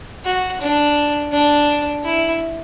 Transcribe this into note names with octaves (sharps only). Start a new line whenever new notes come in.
F#4
D4
D4
E4